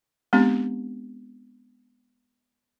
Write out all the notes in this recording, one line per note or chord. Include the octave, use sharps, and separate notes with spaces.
G#3 B3 C4 D4 G4